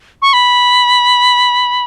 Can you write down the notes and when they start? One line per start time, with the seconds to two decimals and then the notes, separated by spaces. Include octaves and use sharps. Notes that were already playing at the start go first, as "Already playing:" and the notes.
0.22 C#6
0.33 B5